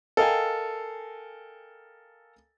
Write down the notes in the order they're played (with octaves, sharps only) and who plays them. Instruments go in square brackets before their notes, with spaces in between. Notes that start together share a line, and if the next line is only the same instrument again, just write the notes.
[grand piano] A4 A#4 D#5 F5 G5 G#5